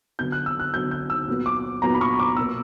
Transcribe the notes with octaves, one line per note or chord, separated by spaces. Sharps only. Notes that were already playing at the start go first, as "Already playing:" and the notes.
D3 F#3 B3 G6
F#6
E6
F#6
D3 F#3 B3 G6
G6
E6
A#2 F#3 B3
D6
A#2 F#3 B3 A#5
B5
C#6
D6
B2 A#3 E6